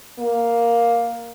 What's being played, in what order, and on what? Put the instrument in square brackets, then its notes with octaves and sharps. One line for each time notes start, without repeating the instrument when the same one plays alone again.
[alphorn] A#3